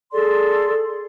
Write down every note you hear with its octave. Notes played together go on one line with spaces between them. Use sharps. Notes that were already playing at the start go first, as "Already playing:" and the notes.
G#4 A4 D5 C6